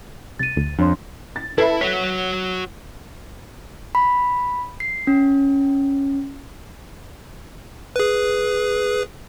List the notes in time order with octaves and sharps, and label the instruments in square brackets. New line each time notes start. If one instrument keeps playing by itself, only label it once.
[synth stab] C2 [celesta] A6 D#7
[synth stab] D2
[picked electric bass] F2 [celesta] D4 C#5 C6
[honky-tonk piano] A6
[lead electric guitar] E4 [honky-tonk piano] A4 [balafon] B4 E5 B5
[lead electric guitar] F#4 C#5 [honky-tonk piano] B6
[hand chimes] B5
C7
C#4
[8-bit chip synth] G#4 B4